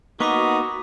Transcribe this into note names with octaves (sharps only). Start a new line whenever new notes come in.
A#3 B3 D#4 F#4 B4 C#6 D6 B6